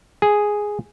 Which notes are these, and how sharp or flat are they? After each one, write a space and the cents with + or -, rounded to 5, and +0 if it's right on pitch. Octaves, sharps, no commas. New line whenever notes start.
G#4 +0 G#5 +0